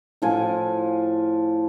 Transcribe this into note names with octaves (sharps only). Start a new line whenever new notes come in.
A2 F3 G#5